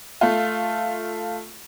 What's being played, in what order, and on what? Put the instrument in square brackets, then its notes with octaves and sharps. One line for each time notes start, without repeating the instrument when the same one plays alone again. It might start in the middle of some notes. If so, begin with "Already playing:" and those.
[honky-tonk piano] A3 F4